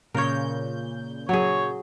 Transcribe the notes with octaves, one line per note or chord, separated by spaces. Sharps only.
A#2 C#3 A#4 C#5 G6
F#3 G#4 C#5